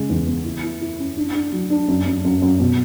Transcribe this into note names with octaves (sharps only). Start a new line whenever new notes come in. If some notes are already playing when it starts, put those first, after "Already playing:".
Already playing: C#3 G#3
E2
B3
E4
E4
E4
C#4
D4
D4
F#3
D4
F#2
F#2
F#2
F#2
B2